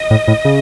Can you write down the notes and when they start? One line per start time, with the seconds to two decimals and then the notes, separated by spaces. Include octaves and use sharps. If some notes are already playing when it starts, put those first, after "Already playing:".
Already playing: D#5
0.10 A2
0.28 A2
0.45 C#3